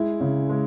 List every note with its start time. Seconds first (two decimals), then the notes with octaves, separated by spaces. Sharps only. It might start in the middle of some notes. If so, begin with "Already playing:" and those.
Already playing: G#3 E4
0.20 C#3
0.49 G#3